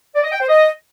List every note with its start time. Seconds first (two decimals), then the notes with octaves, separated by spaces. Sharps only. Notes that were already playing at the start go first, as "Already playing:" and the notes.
0.15 D5
0.24 D#5
0.32 G5
0.40 C5
0.49 D#5